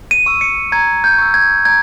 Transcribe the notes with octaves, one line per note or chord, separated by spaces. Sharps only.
D#7
C#6 E6
C#7
A#5 G#6
G6
C#6 E6
G#6
A#5 G#6